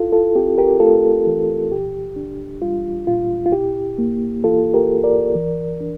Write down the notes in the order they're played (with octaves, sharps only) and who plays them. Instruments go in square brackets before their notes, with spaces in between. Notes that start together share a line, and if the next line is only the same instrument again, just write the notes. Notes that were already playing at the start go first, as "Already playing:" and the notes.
Already playing: [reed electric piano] E4 F4 A4
F4 A4
C4 G4
G4 A#4
A3 F4 A4
E3
A#2 G4
D4
G3 F4
A#2 F4
F4
E4 G4
A#3
E3 F4 A4
G4 A#4
G2
A#4 D5
E3
D4